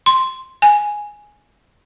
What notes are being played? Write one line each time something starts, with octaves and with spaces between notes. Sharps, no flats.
C6
G#5